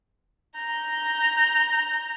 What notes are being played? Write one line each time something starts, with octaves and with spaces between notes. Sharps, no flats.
A#5 G6